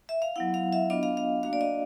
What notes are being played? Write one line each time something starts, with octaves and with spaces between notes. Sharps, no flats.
E5
F5
F#3 B3 E4 F#5
F5
E5
B3 D4 F4 D#5
F5
F5
A#3 D4 F#4 F5
D5
D#5